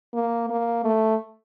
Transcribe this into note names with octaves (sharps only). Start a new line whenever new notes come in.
A#3
A#3
A3